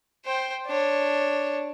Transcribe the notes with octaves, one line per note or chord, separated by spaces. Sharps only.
C5 G5
D4 C#5